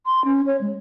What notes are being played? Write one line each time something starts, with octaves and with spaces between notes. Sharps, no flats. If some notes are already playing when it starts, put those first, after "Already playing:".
C6
C#4
C#5
G#3